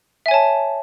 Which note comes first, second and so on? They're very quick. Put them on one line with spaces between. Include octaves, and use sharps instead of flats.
E5 G#5 C#5 A5